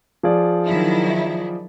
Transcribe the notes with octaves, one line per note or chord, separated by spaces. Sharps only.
F3 G#4 D5
D#3 F#3 E4